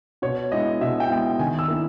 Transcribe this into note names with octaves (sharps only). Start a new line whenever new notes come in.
B2 C#5
G#3 B3 E4 D#5
B2 E5
G5
G#3 B3 E4
D#3 G#5
E6
A#3 E4